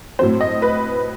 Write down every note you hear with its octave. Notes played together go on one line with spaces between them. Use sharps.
A2 F#3 C4 C5
D#5
B4